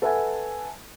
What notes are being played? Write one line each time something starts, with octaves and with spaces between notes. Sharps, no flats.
A4 B4 E5 F#5 G#5 A5